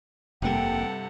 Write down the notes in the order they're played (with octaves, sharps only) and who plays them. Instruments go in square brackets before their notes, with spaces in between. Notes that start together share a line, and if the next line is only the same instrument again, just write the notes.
[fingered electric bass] F1 A#3 [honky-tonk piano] G2 C3 [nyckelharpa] A4 F#5 [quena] G5